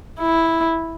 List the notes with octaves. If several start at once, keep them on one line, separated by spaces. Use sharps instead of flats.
E4